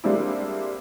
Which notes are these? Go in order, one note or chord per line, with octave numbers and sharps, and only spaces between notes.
G3 G#3 A#3 C4 D4 E4